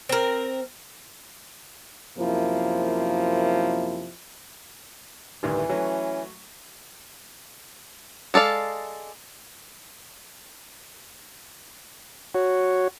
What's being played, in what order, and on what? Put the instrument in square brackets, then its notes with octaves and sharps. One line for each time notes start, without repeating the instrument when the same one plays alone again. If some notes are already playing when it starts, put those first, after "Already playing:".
[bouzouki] C4 A#4
[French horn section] F#2 C3 F3 A#3 E4
[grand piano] A1 D2 D#3 [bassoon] G2 [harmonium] E3
[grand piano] F#3 A3 [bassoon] C#4
[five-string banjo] G#3 A4 D5 F5
[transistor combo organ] F#4 C#5